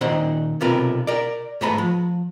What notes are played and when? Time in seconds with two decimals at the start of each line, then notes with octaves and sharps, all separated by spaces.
0.01 A#2 D#3 D#4 C5 F#5
0.61 B1 C3 F4 A#4 B4
1.07 A#4 D5
1.61 G#2 A3 B3 A#5 B5
1.78 F3